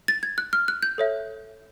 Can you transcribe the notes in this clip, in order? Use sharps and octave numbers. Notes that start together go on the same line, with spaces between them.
A6
G#6
F#6
F6
F#6
G6
A4 C#5 E5